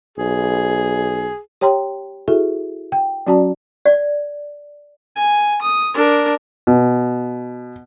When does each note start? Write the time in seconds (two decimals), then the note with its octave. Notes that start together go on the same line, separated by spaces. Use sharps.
0.18 B1 G#4
1.61 G4 C#5 G5 A#5 C6
2.28 E4 F#4 G#4 A4 E5
2.92 G5
3.27 F#3 C#4 F#4 D5 A5 A#5
3.85 D5
5.16 G#5
5.61 D#6
5.94 D4 A#4
6.67 B2